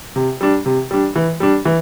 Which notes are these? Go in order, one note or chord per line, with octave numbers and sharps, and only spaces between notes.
C3
G3 D4
C3
G3 D4
E3
G3 D4
E3